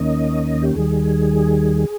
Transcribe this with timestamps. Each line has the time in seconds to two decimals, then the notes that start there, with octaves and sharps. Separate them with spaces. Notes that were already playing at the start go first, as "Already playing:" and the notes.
Already playing: D#2 D#3 A#3 C#4 D#5
0.63 G4
0.75 D#2 D#3 G3 G#4